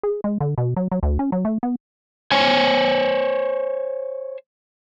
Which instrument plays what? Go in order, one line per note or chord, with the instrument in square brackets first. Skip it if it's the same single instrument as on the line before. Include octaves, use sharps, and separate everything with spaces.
[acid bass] G#4
G#3
D3
B2
F#3
F#3
D2
C#4
F#3
A3
B3
[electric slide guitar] C5 C#5 G#5